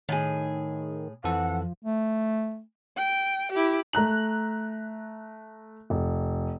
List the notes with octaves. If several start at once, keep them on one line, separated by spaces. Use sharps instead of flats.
A2 D#3 G#4
F2 E3 F3 A4 F#5
A3
G5
E4 G4
A3 A#5 F#6 F#7
F1